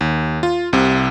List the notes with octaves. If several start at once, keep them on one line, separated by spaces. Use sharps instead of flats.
D#2
F4
C2 C3